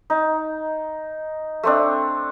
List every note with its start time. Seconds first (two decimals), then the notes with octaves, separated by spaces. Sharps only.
0.10 D#4
1.63 A3 C4 D4